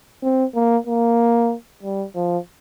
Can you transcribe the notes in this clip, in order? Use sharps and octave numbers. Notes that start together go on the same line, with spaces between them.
C4
A#3
A#3
G3
F3